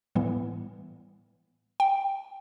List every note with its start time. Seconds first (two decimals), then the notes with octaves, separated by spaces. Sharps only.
0.15 A2 E3 G3 B3
1.80 G5